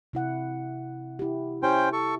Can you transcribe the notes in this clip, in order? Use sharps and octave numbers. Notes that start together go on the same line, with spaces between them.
C3 E4 F#5
E4 G4
C#4 E4 G4 C5 G5
A4 C#6